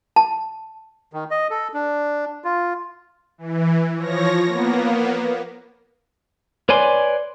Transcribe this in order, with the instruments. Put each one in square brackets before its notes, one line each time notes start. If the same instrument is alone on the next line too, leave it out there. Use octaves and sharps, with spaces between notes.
[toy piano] A5
[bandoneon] D#3
D#5
A4
D4
F4
[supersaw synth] E3
F3 C#5 A#6
A#3 B3
[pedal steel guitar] B4 C#5 D5 G#5 C6